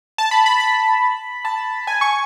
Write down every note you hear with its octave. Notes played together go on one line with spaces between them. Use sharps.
A5
B5
B5
B5
A5
G#5
C#6